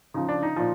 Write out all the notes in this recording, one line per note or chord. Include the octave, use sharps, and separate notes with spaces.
C#3 F3 D#4
D4
D#4
A#2 F3